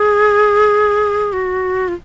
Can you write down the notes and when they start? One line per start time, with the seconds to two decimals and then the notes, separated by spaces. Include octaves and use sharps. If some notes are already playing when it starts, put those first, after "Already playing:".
Already playing: G#4
1.33 F#4
1.88 F4